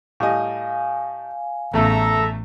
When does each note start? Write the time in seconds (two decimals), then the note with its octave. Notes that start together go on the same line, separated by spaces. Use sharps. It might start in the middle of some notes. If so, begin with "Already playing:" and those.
0.20 A2 G3 D#5 F5 G#5
1.74 A1 E2 C#3 A3 A4 E5 A#5